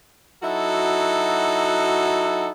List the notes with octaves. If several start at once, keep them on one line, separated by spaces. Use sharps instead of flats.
F#3 D#4 E4 F#4 A4